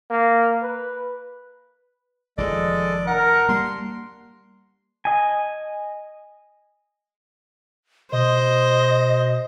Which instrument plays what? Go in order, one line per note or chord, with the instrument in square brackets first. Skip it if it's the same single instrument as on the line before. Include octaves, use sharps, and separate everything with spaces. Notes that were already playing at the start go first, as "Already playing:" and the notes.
[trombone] A#3
B4
[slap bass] F1 D#3 F3 [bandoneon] G#3 A4 D#5 [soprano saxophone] D5
[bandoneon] D4 [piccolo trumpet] A#4 [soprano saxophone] F#5
[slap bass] G3 A#3 [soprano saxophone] C6
[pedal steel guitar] D#5 G#5
[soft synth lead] B2 [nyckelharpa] C5 [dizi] D#5